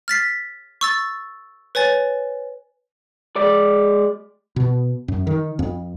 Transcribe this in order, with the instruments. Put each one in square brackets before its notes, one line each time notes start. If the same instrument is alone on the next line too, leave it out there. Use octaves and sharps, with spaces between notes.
[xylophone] F6 A6 B6 C7
C#6 E6 A6
B4 C#5 G#5 A6
[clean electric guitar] G#3 D5
[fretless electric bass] B2
F#2
D#3
F2